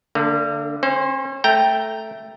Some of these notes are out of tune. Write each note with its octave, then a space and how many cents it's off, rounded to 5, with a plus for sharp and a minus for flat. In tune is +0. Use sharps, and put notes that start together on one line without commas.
D3 +0 A#3 -40
C#4 -40 C5 +0
A3 +0 G5 +0 A#5 +0